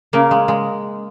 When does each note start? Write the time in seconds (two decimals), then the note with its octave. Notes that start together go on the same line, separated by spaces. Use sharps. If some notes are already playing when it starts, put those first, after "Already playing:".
0.13 C#3 A#3
0.31 G#3
0.48 G#3